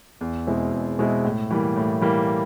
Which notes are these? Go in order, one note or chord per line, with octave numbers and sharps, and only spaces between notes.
E2
B2 G#3 C4 E4
E2
B2 G#3 C4 E4
A2
E3 G3 A#3
A2
E3 G3 A#3